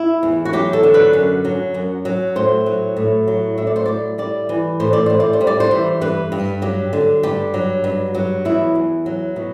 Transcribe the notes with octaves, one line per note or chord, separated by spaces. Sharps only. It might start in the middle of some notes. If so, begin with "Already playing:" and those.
Already playing: E4
E2
F#4
F#3 G4
A4
D3
B4
F#2
F#3
F#2
F#3
A2 C5
F#3
A2
F#3
A2 E5
D5
C5
A2 D5
G3 D5
E3
A2 C5
D5
A2 C5
D5
C5
G3
D5
C5
E3
G2 B4
G2
F#3 G4
D3
G2 G4
F#3
G2
F#3
E2 E4
E2
F#3
B2